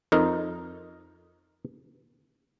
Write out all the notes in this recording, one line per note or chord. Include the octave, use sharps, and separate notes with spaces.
F2 D#4 A#4